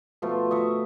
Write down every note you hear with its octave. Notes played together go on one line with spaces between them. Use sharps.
B2 F3 A3 F4
D#5 E5 C#6